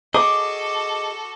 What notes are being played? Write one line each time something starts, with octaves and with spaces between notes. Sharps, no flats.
F#4 G#4 A4 D#5 D6